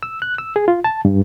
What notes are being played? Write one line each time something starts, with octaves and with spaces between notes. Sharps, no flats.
E6
F#6
E6
G#4
F4
A5
G2